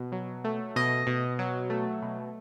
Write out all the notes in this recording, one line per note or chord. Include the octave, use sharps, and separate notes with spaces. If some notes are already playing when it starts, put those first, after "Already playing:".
Already playing: B2
F#3
A3
B2 D#5
B2
F#3
A3
B2